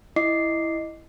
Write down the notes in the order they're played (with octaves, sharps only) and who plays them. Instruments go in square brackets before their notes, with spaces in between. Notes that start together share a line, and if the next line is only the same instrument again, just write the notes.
[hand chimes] E4 D#5 D6 C7